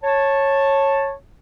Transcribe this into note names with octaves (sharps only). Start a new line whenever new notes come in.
C#5 A5